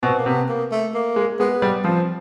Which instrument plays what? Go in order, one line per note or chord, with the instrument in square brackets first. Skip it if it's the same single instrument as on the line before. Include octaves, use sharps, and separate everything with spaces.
[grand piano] B2 [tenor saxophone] C4
[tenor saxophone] A#3
[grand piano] C3 [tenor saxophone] B3
[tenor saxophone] A#3
A3
A#3
[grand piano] G#3
[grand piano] G#3 [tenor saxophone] B3
[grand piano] G3
[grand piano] F3 [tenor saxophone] C4